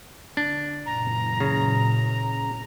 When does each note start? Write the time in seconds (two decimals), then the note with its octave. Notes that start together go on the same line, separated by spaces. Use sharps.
0.37 D3 D4
0.86 F#1 A#2 E3 A#5
1.40 C#3